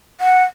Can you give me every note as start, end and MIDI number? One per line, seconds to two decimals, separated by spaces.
0.21 0.44 78